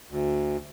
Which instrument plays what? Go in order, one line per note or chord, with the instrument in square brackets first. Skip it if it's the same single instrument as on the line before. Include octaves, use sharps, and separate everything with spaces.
[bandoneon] D2